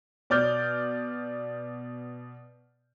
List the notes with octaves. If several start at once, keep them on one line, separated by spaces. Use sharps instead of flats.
B2 D5 F6 G6